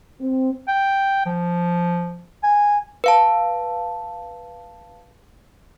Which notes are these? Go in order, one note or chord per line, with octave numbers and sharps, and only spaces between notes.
C4
G5
F3
G#5
B4 F5 A5